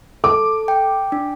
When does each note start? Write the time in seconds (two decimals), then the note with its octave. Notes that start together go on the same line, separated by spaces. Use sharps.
0.24 A4 D6
0.68 G5
1.12 D4